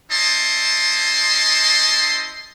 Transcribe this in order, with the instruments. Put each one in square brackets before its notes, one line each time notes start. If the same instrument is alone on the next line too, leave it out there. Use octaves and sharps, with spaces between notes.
[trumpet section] C#4 E4 C5 D#5 A5 C6